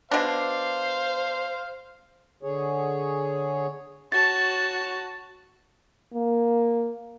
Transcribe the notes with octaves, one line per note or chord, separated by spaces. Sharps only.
B2 D4 C5 F5
D3 G#4 C#5
F#4 C#5 A5 A6
A#3